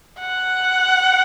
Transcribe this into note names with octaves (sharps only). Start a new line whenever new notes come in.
F#5